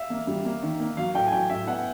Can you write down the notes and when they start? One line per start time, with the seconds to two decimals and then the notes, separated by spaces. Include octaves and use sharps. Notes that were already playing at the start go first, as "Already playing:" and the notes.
Already playing: E5 F5
0.10 A#3
0.27 G3
0.45 A#3
0.62 D#3
0.80 A#3
0.97 F#3 F5
1.15 A2 G5
1.27 G#5
1.32 F#3 G5
1.50 A2 E5
1.67 B3 F#5